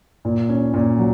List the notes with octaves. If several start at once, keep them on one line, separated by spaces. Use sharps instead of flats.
A#2
C#4
A#2
F#3